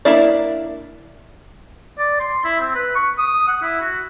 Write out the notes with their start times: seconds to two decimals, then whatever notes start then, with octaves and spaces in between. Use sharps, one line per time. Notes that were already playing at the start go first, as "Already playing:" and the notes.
0.05 A#3 D4 E4 D5
1.99 D5
2.20 C6
2.44 E4
2.60 C4
2.75 B4
2.95 C#6
3.18 D#6
3.48 F#5
3.62 E4
3.81 F#4